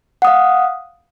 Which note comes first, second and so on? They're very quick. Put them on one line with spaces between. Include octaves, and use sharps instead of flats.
F#5 D#6 F5